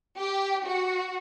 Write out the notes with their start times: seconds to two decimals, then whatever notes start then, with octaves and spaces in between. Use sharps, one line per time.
0.17 G4
0.64 F#4